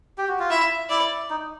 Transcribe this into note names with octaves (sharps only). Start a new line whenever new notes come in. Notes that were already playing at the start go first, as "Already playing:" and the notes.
G4
F#4
F4
E4 E5
E4 D5
D#4